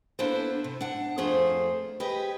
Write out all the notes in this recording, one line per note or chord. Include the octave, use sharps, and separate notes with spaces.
A#3 B3 D4 E4 A4 C5
C3
D4 F#5
F2 F3 A3 G#4 C5
G4 G#4 B4 D#5